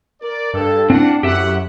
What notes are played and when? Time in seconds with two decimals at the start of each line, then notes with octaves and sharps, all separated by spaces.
0.22 A#4 D5
0.54 G2 A4
0.90 C4 D4 E4 F5 F#5
1.23 A1 F#2 G4 E5 F#5